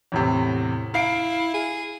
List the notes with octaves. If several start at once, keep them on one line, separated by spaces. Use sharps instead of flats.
E2 A2 C3
E4 F5 C7 D7
G#4